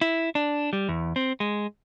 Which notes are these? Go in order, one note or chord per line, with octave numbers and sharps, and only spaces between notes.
E4
D4
G3
E2
C4
G#3